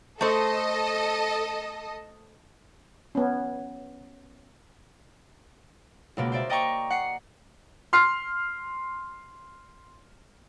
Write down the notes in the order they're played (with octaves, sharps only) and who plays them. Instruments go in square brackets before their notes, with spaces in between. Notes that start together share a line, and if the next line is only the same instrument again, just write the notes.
[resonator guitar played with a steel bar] A3 C5 [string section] A4 D#5
[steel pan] B3 C#4
[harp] C#2 B2 A#3
C5 D5 E5
D5 D#5 G5 A#5 C#6
F#5 C7 C#7
[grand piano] C6 F6 C7